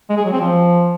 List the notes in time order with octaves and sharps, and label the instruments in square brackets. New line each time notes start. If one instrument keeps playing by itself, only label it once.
[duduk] G#3
G#4
F#3
C4
F3